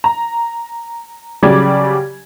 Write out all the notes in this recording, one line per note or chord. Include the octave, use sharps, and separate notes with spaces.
A#5
C#3 F#3 G3 D5 D6 G#6